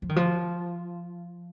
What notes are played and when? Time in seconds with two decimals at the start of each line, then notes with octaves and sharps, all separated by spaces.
0.02 F3
0.09 D#3
0.16 F3